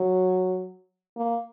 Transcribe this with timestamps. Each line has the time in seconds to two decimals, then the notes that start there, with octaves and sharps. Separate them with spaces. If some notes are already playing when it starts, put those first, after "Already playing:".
Already playing: F#3
1.17 A#3